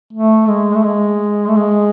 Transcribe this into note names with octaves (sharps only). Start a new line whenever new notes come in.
A3
G#3
A3
G#3
A3
G#3